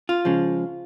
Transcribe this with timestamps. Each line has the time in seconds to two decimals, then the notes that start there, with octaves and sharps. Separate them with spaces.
0.09 F4
0.25 C#3 F3 G#3